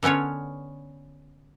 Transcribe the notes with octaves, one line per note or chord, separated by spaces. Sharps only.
D3 B3 C#4 F4 C#5